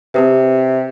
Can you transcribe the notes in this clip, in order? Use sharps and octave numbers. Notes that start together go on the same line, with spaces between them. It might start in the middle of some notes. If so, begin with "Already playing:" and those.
C3 C4 G4 B4